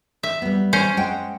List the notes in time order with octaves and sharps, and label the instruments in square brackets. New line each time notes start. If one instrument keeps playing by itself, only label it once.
[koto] E5
[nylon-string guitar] G3 B3
[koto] C#4 C5
[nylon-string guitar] G#3 F#5 G5